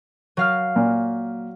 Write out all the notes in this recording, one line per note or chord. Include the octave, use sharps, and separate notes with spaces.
F#3 F5 F6
A#2